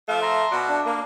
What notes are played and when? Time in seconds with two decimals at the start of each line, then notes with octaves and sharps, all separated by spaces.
0.08 F3 A3 E5 F5
0.22 A#5 C6
0.51 B2 F#4 D5
0.69 D4
0.86 A#3